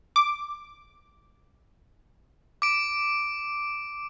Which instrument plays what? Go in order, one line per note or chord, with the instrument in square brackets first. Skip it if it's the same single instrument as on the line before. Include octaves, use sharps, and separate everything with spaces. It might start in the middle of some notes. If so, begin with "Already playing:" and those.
[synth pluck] D6
[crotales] D6 D7